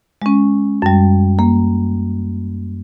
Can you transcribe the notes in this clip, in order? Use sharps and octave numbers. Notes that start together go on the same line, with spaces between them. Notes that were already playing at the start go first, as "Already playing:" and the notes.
G#3 C#4
F#2 G3
A#3